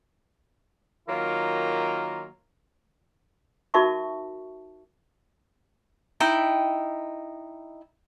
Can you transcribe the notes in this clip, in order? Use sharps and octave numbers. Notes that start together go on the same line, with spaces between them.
D#3 F#3 A#3 F4 A#4
D#4 F#4 A#4 E5 A5 C#6
D#4 E4 G5